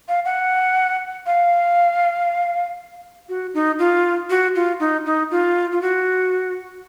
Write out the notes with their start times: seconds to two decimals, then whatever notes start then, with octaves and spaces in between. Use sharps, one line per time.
0.08 F5
0.25 F#5
1.26 F5
3.29 F#4
3.54 D#4
3.79 F4
4.30 F#4
4.55 F4
4.80 D#4
5.06 D#4
5.31 F4
5.72 F4
5.82 F#4